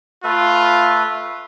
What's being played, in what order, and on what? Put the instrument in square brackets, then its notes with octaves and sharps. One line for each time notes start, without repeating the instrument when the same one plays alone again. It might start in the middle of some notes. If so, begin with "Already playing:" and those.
[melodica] A3 B4 E5 [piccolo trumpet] F4